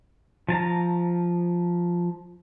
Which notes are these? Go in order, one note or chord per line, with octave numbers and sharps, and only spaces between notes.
F3 A5 A#5